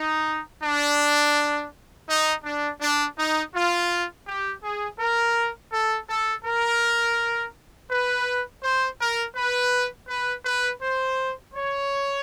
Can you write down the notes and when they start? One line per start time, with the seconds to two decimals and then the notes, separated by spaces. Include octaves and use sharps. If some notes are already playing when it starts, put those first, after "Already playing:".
Already playing: D#4
0.63 D4
2.08 D#4
2.44 D4
2.80 D4
3.18 D#4
3.54 F4
4.26 G4
4.62 G#4
4.99 A#4
5.72 A4
6.09 A4
6.44 A#4
7.90 B4
8.62 C5
8.99 A#4
9.35 B4
10.09 B4
10.45 B4
10.81 C5
11.54 C#5